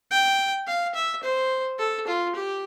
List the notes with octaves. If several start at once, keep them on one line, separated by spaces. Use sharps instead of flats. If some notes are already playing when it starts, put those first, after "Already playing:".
G5
F5
E5
C5
A4
F4
G4